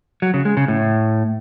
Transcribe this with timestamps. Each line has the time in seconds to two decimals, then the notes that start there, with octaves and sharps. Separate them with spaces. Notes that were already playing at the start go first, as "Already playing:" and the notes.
0.22 F#3
0.34 C#3
0.45 G#3
0.57 C#3
0.68 A2